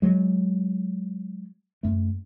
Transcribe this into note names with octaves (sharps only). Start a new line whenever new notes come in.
F#3 G#3
F#2 A3